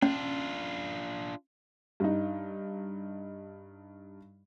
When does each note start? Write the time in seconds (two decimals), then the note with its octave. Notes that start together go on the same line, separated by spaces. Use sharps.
0.02 C#4 D4 F4
2.00 G2 D#4